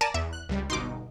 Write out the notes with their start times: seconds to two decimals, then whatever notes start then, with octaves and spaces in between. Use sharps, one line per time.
0.01 A#4 D5 G#5 A5 A#6
0.14 E2 E5
0.33 F#6
0.49 C#2 G3
0.70 G1 B2 D#4 C6 D6